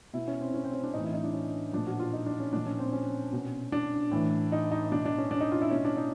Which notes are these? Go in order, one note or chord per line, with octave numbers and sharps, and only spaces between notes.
B2 E4
C#4
C4
C#4
C4
C#4
D4
A2 E3 D#4
E4
D#4
D4
C#4
A#2 F3 D4
F#4
F4
D#4
D4
C#4
A#2 F3 D4
C#4
C4
C#4
B2
D4
A2 E3
D#4
D#4
B2 D4
D4
C#4
D4
D#4
F4
E4
B2 C#4
D4
D#4